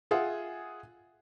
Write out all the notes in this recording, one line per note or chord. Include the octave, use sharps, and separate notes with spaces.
F4 G#4 E5 F#5